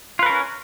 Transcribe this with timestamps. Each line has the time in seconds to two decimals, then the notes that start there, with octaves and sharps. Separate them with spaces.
0.19 F4
0.23 B4
0.26 A#4
0.30 C#4